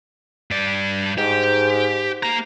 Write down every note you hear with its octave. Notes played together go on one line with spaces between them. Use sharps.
G2 D5
G#2 G4
A#3 A#5